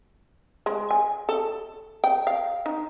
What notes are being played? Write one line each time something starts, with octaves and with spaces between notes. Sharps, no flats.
G#3
G#5
A4
G5
F5
D#4